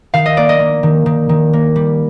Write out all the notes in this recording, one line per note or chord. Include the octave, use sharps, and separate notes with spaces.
D#3 F5
D#5
A#3 D5
D#5
A#3
D#3
D#3
D#3
A#3
G3